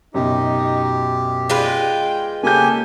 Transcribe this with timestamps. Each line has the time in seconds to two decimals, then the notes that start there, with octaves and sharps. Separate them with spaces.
0.14 F#2 B2 D#4 G4
1.50 G#3 F4 B4 G5
2.43 C#3 A#3 G4 A4 G#5 G6